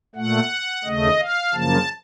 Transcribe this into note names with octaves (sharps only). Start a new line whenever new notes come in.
A#2 A3 F#5
D#2 C#3 A3 D#5
F5
F#2 C#3 F3 A#3 A5